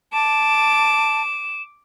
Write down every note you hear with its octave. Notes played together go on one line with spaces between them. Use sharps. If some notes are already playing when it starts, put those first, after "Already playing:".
A5 D6 E7